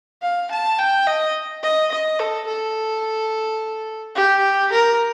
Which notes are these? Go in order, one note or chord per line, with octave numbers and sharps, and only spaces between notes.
F5
A5
G5
D#5
D#5
D#5
A4
A4
G4
A#4